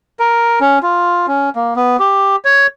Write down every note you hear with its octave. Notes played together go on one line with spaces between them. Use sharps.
A#4
C#4
F4
C#4
A#3
B3
G4
C#5